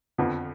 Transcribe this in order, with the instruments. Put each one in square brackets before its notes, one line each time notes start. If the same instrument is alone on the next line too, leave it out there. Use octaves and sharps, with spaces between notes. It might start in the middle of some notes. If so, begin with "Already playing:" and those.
[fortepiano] F2 D3 F3 B3